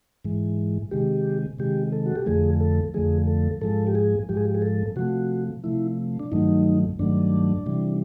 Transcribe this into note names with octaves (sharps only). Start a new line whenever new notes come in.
G#2 E3 G#3
C3 D#3 G#3 G4
C3 D#3 G#3 G4
A4
F#4
G4
F2 D3 F3 A3 G#4
A4
F2 D3 F3 A3 G#4
A4
G#2 F3 G#3 A4
G4
G#4
G#2 F3 G#3 G4
G#4
G4
G#4
A4
C3 F3 A3 F#4
C3 F3 A3 E4
D4
G2 D#3 F#3 A3 D#4
G2 D#3 F#3 A3 D4
C3 E3 G3